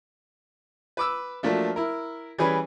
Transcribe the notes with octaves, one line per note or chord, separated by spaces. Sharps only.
B4 D6 E6
F3 F#3 A3 A#3 D4
E4 A#4
E3 G3 C#4 G#4 B4